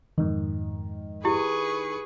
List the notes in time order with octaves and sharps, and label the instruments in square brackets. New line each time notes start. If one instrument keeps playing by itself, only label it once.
[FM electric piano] F2 G#2 [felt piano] D#3
[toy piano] E4 G4 [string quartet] G#4 B4 C#6